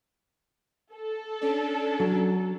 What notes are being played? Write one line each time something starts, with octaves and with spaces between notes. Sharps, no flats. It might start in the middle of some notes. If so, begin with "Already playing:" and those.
A4
C#4 D4
F#3